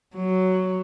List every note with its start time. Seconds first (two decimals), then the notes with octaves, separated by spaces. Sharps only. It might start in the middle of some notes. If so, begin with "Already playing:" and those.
0.16 F#3